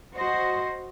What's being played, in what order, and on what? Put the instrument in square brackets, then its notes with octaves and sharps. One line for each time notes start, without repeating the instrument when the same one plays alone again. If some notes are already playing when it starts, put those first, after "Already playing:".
[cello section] F#4 C5 D#5